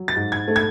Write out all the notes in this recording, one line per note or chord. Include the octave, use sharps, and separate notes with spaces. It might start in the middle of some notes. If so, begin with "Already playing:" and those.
Already playing: F#3
A6
G#2
G#6
A3
G#6